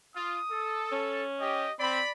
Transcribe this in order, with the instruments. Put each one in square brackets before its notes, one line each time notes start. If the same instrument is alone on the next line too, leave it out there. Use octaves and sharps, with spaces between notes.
[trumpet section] F4 [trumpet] D#6
[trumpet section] A4
[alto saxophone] C#4
[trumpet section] G4 [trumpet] D#5
[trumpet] C4 [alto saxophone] D5 [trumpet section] B5